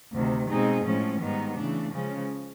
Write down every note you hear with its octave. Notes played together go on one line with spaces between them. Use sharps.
D2 C3 D#3
B2 G#3 C4 D#4 G#4
A2 F3 G#3 C#4
G#2 D#3 G3 B3 D#4
C#3 E3 A3 D4
C#3 F3 G#3 C#4